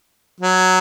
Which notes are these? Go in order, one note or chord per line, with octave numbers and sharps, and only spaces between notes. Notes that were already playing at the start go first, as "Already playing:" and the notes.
F#3